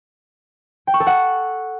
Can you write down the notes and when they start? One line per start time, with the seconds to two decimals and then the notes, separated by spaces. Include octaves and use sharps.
0.87 G5
0.94 C#6
1.00 A4
1.07 F#5